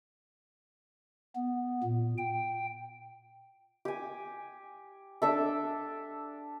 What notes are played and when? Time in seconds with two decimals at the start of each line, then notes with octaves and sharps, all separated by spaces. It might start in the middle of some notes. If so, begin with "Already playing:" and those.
1.36 B3
1.83 A#2
2.18 G5
3.85 G4 G#5
5.22 D4 A4 E5